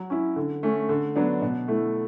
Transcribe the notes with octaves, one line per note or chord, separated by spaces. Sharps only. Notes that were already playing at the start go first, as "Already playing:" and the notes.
Already playing: F#3
C#4 E4
D3
A3 C#4
D3
F#3 B3 D4
B2
A3 E4